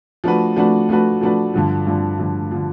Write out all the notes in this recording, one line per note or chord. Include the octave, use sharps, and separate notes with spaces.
F3 A3 D4 F#4 B4
F3 A3 D4 F#4 B4
F3 A3 D4 F#4 B4
F3 A3 D4 F#4 B4
G2 D3 F3
G2 D3 F3
G2 D3 F3
D3 F3